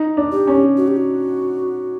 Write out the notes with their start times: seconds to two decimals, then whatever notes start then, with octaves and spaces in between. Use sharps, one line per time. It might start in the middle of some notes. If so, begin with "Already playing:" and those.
Already playing: D#4
0.17 D4
0.32 G4
0.47 C#4
0.77 F#4
0.88 G4
0.97 F#4